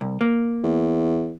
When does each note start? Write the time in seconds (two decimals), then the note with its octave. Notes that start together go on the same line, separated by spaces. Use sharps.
0.01 C2
0.21 A#3
0.64 E2